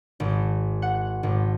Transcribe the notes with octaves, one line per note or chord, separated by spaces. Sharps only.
G#1
F#5
G#1